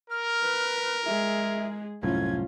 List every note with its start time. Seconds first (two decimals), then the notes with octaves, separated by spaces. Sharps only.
0.10 A#4 F6
0.43 B4
1.06 G#3 G#4 E5
2.03 C2 F#2 A2 C#4 F4 G#6